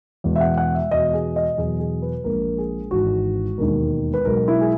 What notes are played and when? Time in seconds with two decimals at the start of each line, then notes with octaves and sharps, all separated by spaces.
0.24 E2 B2 G#3
0.36 E5
0.41 F#5
0.57 F#5
0.74 E5
0.91 E1 E2 B2 D#5
1.13 G#4
1.36 D#5
1.58 E2 B2 F#3 G#4
1.80 G#4
2.02 B4
2.24 A#1 A#2 G#3 A#4
2.58 G#4
2.91 G#1 G#2 E3 F#4
3.58 E1 D#2 D#3 G#3 A#4
4.14 B4
4.25 B1 B2 G#3 A#4
4.48 E4
4.61 G#4